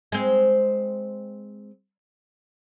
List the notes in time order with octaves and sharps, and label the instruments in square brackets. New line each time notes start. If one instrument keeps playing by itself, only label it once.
[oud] G#3 C4